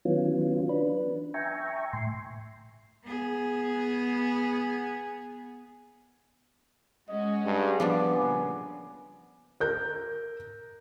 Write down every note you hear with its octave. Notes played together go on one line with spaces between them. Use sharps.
D#3 E3 F#3 B3 C#4 F4
D4 B4
E5 G5 G#5 A#5 C#6
A2 C6
B3 G#4
G#3 C#4 F#4 D#5
G2 G#4
F3 G3 B3 D4 D6
A#2 C#3 G#5
A#4 G6